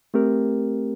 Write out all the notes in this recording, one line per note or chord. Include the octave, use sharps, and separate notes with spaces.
A3 C4 G4 A#4